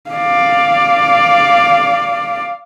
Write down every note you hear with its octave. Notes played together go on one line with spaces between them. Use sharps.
D5 F5